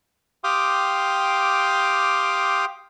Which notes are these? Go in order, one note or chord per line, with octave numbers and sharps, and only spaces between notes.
G4 F5 G5 C6 D6 D#6